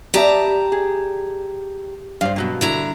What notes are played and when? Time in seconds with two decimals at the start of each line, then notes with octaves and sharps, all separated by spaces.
0.14 B3 G4 D5 E5 A5 A#5
0.72 G#4
2.21 G2 C5 D5 F5
2.36 B2 F#3 A#3
2.61 D3 E4 A#5